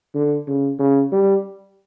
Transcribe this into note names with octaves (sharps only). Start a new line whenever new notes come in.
D3
C#3
C#3
G3